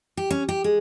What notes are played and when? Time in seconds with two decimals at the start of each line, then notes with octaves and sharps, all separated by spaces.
0.17 G4
0.31 C#4
0.49 G4
0.64 G#3